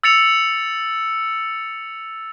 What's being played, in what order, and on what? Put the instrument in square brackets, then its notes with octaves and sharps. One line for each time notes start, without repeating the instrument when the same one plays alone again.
[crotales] E6 A6 C#7 F7